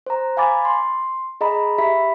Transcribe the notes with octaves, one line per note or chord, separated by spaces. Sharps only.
C5 A#5
F5 G#5 B5 D6 A6
C6
G#4 D#5 A#5 B5
G4 E5 B5 B6